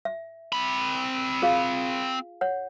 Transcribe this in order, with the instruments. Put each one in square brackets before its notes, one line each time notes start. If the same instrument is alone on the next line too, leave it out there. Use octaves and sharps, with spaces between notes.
[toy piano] E5
[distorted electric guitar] C4 B5
[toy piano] F4 G#4 F5
C#5 F#5